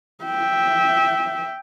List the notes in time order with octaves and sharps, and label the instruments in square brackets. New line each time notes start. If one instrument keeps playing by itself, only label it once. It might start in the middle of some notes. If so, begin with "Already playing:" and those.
[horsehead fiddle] E5 G5